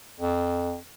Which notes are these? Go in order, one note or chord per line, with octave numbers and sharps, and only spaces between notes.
F2